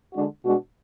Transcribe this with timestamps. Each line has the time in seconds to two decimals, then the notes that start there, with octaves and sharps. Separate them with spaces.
0.13 D3 G#3 D4 F#4
0.43 B2 G#3 D4 F#4